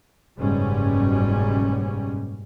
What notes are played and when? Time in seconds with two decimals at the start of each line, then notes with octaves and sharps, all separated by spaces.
0.38 F#1 G#2 B2 G3 C#4